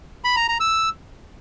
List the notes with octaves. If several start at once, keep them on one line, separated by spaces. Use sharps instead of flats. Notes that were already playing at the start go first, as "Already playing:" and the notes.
B5
A#5
A#5
E6